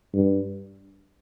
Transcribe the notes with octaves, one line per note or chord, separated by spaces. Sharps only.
G2